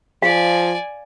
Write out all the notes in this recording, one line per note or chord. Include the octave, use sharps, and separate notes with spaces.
F3 D5 F5 G#5